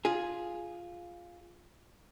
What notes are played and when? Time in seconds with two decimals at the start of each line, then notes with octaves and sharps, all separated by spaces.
0.05 F4 G#4